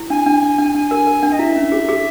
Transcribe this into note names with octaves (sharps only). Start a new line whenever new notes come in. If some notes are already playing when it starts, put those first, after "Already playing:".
Already playing: E4
D4 G#5
D4
D4
D4
D4 G#5
A#4
A#4
D4
D#5
E4 E5
C#4
G#4
G#4